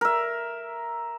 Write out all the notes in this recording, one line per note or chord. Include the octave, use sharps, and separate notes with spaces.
A#4 E5